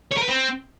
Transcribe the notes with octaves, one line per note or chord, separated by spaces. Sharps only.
C#5
A#4
B4
C4